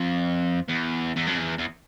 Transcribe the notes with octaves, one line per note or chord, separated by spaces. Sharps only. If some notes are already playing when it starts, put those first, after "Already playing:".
Already playing: F2
E2
E2
F2
E2
E2